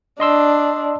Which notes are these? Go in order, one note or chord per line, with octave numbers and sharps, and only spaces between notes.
D4 D#5 C6 E6